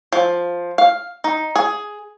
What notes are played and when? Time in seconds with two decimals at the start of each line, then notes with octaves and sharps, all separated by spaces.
0.13 F3
0.78 F5
1.24 D#4
1.56 G#4